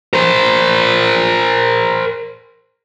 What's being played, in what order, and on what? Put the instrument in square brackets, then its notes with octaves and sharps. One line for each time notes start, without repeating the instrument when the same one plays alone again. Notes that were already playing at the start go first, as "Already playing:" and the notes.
[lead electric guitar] A#4 C5